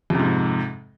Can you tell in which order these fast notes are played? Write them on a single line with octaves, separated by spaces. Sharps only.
F2 C3 G#2